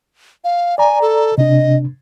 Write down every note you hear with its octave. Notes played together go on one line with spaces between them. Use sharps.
F5
D5 G#5 A#5
A4
C3 D4 D#5